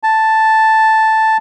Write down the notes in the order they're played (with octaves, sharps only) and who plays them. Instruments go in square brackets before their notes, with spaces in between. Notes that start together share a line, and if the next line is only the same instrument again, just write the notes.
[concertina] A5